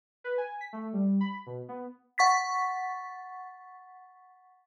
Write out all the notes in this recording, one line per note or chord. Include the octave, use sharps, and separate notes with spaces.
B4
G#5
B6
A3
G3
B5
B2
B3
F#5 C#6 A6 B6